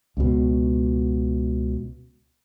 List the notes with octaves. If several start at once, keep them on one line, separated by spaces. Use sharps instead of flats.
C#2 B2